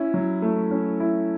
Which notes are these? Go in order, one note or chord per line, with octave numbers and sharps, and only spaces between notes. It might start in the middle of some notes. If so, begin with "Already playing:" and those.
Already playing: C#4 E4
F#3
A3
C#4
E4